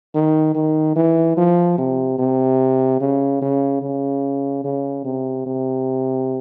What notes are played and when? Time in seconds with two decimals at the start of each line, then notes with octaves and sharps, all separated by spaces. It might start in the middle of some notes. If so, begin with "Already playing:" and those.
0.15 D#3
0.55 D#3
0.96 E3
1.37 F3
1.78 C3
2.19 C3
3.01 C#3
3.42 C#3
3.82 C#3
4.65 C#3
5.05 C3
5.46 C3